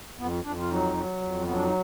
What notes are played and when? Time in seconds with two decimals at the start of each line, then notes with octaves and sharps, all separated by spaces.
0.19 F2 B3
0.44 F2 D4
0.60 F4
0.70 F#3 D#4
0.97 F#3
1.21 F2
1.45 F#3 B3
1.54 D4
1.64 D#4